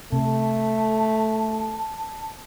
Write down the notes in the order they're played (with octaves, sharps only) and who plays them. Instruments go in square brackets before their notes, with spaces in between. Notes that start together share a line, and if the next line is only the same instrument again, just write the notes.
[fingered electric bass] C3 [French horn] A3 [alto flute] A5